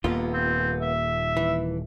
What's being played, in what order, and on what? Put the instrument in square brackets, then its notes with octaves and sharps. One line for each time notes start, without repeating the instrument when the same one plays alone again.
[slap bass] D#1 D#2 A#3 [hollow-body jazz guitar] B3 F4
[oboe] C4
E5
[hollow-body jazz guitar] E3